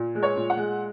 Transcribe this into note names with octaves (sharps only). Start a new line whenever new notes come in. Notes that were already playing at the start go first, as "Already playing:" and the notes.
Already playing: A#2
G#3
C#5
A#2
F#5
G#3